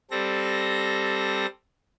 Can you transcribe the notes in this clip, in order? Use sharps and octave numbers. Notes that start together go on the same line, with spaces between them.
G3 C4 A4 A#6